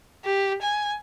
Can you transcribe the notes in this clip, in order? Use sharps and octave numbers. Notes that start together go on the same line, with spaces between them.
G4
G#5